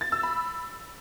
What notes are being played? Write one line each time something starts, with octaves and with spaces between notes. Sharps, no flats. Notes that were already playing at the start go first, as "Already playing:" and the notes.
A6
E6
B5